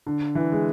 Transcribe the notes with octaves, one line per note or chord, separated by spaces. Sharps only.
D3
E3
G#3